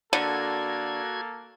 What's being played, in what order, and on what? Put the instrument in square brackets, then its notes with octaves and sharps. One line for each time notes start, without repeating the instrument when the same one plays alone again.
[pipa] D3 [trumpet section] A#3 A4 [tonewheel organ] F#4 G#6